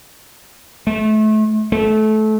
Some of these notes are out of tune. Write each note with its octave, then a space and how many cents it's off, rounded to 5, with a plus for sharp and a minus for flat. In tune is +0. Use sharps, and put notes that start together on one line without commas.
A3 -30
A3 -25